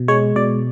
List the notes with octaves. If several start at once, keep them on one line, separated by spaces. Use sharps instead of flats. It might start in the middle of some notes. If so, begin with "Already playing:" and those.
Already playing: B2
G#3 C#5
B2 D5